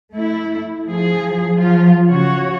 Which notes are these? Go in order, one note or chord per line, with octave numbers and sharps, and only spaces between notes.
A3 E4
F3 G#4
F3 F#3 F4
C#3 F#4 C#5